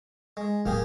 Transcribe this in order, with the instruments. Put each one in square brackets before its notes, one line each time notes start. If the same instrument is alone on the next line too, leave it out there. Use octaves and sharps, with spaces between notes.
[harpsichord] G#3
[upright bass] D1 [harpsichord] A#3 G4 G#4